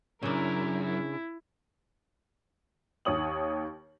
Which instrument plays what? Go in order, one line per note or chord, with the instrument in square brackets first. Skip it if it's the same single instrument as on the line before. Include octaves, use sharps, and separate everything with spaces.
[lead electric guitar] F#2 [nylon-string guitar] C#3 D4 [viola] E4 A#4
[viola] E4
[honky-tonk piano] D#2 C#5 D#6 F#7